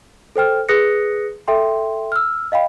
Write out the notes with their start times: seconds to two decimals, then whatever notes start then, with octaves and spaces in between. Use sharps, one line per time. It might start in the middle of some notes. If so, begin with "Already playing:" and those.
0.36 A4 C5 G5 F6
0.69 G#4 B4 D#6 F#6 A#6 C#7
1.48 A4 E5 G5 C6
2.12 E6 F6
2.52 D#5 F5 G5 B5